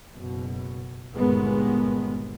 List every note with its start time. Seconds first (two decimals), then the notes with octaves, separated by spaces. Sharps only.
0.12 F#1 B2
1.14 G1 C#2 A#2 D#3 G#3 B3